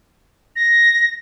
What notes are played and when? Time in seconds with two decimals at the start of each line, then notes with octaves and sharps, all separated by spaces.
0.56 A#6